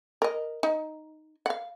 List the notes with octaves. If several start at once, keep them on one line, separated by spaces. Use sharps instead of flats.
A#4 D#5
D#4
F5 F#5